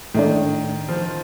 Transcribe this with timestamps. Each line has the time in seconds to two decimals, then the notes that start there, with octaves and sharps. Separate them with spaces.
0.14 A2 D#3 A3 D4
0.89 F3